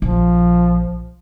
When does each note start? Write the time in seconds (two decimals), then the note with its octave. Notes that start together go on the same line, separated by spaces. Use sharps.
0.02 A#1 F3